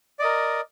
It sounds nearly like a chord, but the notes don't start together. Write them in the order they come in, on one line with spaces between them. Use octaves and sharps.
D5 D#5 A#4